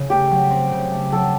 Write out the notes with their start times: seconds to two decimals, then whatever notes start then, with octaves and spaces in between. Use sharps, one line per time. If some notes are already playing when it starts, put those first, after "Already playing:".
Already playing: C#3
0.10 A3 G4
0.31 F#3
0.50 C4
0.71 C#3
0.92 A3
1.12 F#3 A4